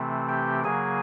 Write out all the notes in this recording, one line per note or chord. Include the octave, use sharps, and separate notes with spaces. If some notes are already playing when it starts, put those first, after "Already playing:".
Already playing: C3 E3 A3 C4
G4 G5
C#3 F#3 A#3 G#4 G#5